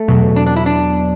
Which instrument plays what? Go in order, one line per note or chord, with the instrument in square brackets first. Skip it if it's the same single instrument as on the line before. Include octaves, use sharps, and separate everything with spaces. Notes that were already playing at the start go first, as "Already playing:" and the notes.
Already playing: [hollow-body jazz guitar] A3
[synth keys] E2 B2 F#3
[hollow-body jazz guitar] D4
D4
E4
D4